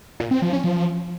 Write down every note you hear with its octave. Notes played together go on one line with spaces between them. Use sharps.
A#2
C4
F3
C#4
F3